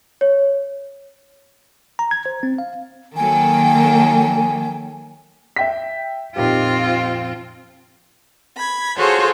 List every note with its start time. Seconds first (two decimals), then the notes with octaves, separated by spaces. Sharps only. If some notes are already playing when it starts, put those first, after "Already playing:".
0.21 C#5
1.99 A#5
2.11 G#6
2.26 C5
2.43 C4
2.58 F5
3.16 D#3 F#3 A#3 A4 G5 G#5
5.56 E5 G5 B6
6.36 F2 A#2 C4 D#4 F4 G4
8.56 B5 G#6
8.97 F4 F#4 G#4 A4 C5 C#5